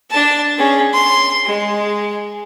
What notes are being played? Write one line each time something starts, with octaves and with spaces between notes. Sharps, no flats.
D4 A5
C#4 G#4
C6
G#3